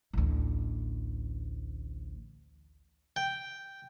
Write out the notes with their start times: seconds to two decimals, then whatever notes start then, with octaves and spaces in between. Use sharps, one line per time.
0.13 A1 D2
3.16 G5